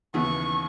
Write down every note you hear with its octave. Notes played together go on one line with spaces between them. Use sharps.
D#2 C#3 E3 B3 E4 C#6